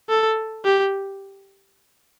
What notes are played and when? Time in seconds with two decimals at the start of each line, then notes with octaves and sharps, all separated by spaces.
0.09 A4
0.65 G4